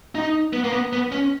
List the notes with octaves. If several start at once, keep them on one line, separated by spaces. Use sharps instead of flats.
D#4
B3
A#3
B3
B3
C#4